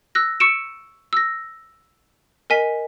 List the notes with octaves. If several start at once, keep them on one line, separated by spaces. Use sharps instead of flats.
E6 F#6 A#6
C#6 E6 C#7 D7 E7
E6 A#6
A#4 D#5 G#5 B6